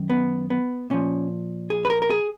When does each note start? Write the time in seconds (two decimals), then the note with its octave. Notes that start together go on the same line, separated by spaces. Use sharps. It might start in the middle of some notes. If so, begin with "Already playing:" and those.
Already playing: F#2 D#3
0.10 B3
0.50 B3
0.90 A#2 F3 C#4
1.70 G#4
1.85 B4
1.90 A#4
2.02 A#4
2.10 G#4